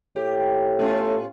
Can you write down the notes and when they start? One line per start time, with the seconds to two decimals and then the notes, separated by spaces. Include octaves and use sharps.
0.16 A2 G4
0.79 A3 B3 C#4 F4